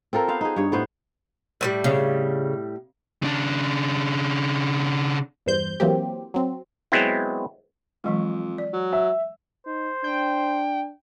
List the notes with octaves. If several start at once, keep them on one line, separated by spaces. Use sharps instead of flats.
C4 F4 A4 A#4
B3 C5 F5
D#4 G#4
G2 C#5
A2 B3 C5
A2 F#3 G3
C#3
C#3 D4
E2 G2 C5 G6
E3 F#3 A#3 C4 G4
F#3 C4
F#3 G#3 B3 C4 E4
F2 E3 F#3 G#3
D5
F#3
E5
D#4 C5
D4 G5